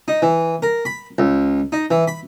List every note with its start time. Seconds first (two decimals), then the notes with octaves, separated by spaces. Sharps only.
0.08 D#4
0.22 E3
0.62 A#4
0.85 B5
1.18 C#2
1.72 D#4
1.91 E3
2.08 B5